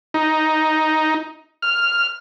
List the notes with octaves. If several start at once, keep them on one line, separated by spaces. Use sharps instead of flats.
D#4
F6